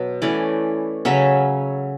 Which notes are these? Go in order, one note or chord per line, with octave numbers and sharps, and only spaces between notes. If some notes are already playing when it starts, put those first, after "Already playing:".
Already playing: B2 F#3
E3 A3 C#4 D5
C#3 F#3 C#4 E5